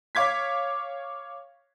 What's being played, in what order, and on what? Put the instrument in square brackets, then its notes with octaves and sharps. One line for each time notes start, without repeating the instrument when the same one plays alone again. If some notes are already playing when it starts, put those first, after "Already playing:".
[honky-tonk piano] C#5 F5 D6 G#6 B6